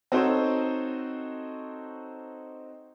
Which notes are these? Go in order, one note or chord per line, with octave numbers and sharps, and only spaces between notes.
C4 D#4 F#4 A4 C5 C#5